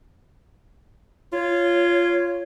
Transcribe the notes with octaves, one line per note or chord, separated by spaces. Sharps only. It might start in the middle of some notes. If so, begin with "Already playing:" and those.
F4 C#5